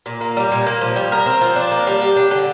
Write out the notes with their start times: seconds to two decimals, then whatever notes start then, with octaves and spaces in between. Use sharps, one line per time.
0.06 A#2
0.21 A#3
0.37 G3
0.52 A#2
0.66 A#3
0.81 F3
0.96 G3
1.12 A#4
1.26 C4
1.41 F3
1.56 D4
1.72 A#3
1.87 G3
2.02 G4
2.16 D4
2.31 D3